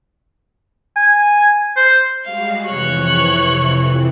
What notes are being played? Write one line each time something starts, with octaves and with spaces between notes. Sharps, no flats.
G#5
C5
G3 G#3 F#4 F5
F2 C3 E3 C#5 F#6